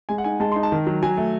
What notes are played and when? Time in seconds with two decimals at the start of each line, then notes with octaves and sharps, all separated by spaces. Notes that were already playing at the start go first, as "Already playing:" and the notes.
0.09 G#3 G#5
0.18 F#5
0.24 D#4 G#5
0.40 G#3 A5
0.52 D#4 C6
0.63 A5
0.72 D#3
0.87 F#3
1.03 F#3 G#5
1.17 A3